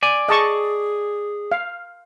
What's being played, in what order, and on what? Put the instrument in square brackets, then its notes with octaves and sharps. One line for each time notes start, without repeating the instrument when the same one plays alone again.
[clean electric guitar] D5 G#5
[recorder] G#4 [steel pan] D#5 A5 C#6
[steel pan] F5